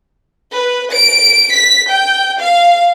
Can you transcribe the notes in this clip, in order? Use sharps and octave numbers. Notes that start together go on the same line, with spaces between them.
B4
D7
B6
G5
F5